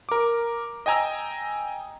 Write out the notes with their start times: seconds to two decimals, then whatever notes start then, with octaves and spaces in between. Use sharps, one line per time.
0.09 A#4 D6
0.86 D#5 G5 G#5 A#5 E6